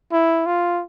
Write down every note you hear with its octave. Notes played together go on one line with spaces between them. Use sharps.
E4
F4